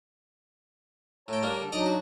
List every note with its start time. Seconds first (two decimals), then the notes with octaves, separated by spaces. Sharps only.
1.28 A2 C#5 G5 A5 A#5
1.43 G3 A#3 D4
1.59 D3 A4
1.72 F#3 D4 D#4 D5 D#5 A#5
1.86 F#4